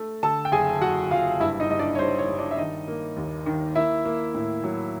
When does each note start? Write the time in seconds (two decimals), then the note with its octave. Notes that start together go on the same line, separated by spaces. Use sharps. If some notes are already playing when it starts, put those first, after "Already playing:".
Already playing: A3
0.23 D3 A4 A5
0.45 G5
0.52 F#1 G#4 G#5
0.81 F#1 F#4 F#5
1.11 F#1 F4 F5
1.40 G2 E4 E5
1.60 D#4 D#5
1.70 G2 D#5
1.79 D4 D5
1.95 C#5
1.99 G2 C5
2.19 C#5
2.29 G2
2.38 D4 D5
2.51 E5
2.58 D#3 D#4 D#5
2.88 A#3
3.17 D#2
3.46 D#3
3.75 A#3 E4 E5
4.05 A#3
4.35 A2
4.64 F#3